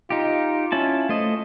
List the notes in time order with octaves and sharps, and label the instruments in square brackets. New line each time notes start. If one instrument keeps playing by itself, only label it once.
[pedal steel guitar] D#4 G4 [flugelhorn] F4
[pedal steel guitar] C#4 E4 A5
A3 C5 D#5